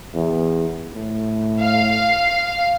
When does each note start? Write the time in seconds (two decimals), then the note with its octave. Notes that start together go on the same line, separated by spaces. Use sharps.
0.15 E2
0.95 A2
1.61 F5